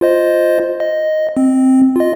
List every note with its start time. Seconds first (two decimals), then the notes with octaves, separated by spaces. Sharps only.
0.01 F4 C5 D#5
0.80 D#5
1.37 C4
1.96 F4 D#5